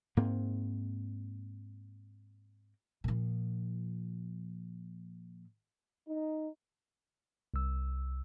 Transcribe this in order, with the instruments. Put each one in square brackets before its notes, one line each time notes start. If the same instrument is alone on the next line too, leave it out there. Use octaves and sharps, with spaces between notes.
[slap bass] G#2 A#3 C4
[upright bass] A#2 F3
[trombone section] D#4
[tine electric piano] C2 E6